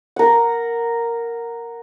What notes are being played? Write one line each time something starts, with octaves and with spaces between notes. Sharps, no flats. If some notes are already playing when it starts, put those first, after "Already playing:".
A#4 F#5